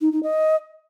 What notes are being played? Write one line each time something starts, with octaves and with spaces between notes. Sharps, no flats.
D#4
D#4
D#5